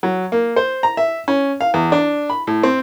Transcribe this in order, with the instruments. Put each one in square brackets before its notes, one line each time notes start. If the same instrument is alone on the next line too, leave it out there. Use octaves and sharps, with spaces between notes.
[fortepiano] F#3
A#3
C5
A#5
E5
C#4
F5
E2
D4
B5
A2
C4